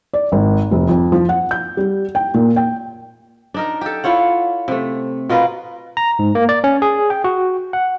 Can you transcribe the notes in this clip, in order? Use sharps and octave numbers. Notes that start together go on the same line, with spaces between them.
D5
G#1
F1
F2
F3
F#5
G6
G3
G5
A#2
G5
D4 D#4 A#4
G4 A4
E4 F4 C#5 F#5
C3 A3
B2 F4 A#4 B4
A#5
G#2
A#3
D5
C#4
G#4
G5
F#4
F#5